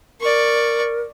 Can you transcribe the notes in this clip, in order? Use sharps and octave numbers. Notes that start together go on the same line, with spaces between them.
A#4 D5 C#6